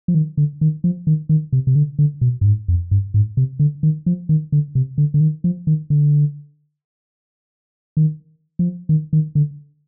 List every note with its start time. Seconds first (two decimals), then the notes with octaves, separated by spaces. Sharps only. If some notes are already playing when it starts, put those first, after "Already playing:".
0.08 F3
0.15 D#3
0.37 D3
0.61 D#3
0.84 F3
1.07 D#3
1.29 D#3
1.53 C3
1.67 C3
1.75 D3
1.99 D3
2.21 B2
2.41 G2
2.46 G#2
2.68 F2
2.91 G2
3.14 G#2
3.37 C3
3.59 D3
3.83 D#3
4.06 F3
4.29 D#3
4.52 D3
4.75 C3
4.98 D3
5.14 D3
5.21 D#3
5.44 F3
5.67 D#3
5.90 D3
7.97 D#3
8.59 F3
8.89 D#3
9.13 D#3
9.35 D3